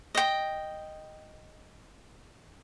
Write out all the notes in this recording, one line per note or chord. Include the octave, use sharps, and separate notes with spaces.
D#5 G5